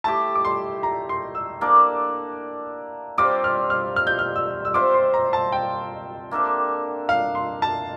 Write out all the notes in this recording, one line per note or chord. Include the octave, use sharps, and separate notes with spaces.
A3 E4 G4 A5
D6
C6
A#5
C6
E6
A#3 D4 A4 D5
G3 C4 F4 D6
F6
F6
F6
G6
F6
E6
E6
C4 F4 C5 E5 D6
C6
A#5
A5
G5
A#3 D4 A4 E5
F5
C6
A5